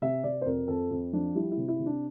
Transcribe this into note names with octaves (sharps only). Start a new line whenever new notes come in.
C3 E5
C3 D5
C5
F2 A#4
F2 A4
F2
F3 D4
G3 E4
E4
C3
E4
C3
D4